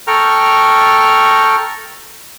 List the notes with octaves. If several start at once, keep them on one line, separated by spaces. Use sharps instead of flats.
A4 G5 A#5 C#6 F6